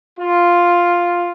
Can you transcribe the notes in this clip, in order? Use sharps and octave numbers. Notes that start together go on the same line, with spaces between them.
F4